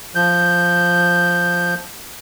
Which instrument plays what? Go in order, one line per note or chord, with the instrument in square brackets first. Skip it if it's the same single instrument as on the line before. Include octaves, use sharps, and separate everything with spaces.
[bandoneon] F3 G6